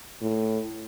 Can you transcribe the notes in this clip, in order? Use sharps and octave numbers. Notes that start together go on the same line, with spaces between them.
A2